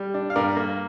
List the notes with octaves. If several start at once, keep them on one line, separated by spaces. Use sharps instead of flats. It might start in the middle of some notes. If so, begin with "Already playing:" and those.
Already playing: G3
D4
F5
G2 A#4 D5
A#3